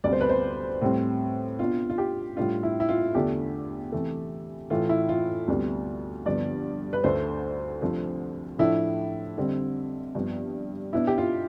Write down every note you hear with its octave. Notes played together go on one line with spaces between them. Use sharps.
D2 C3 G3 B3 D5
C5
B4
C5
A2 G3 C4
B2 B3 D4 F4
F4
G4
A2 G3 D4 F4
E4
E4
F4
E2 D3 A3 D4 G4
C3 E3 A3
A2 E3 A3 F4
E4
F4
D2 C3 G3 B3
G2 D3 F3 B3 D5
B4
D2 D3 A3 C5
C2 C3 F3 A3 D4
A2 F3 A3 D4 E4
F2 D3 G3 C4
G2 F3 B3 D4
B2 B3 D4 E4
G4
F4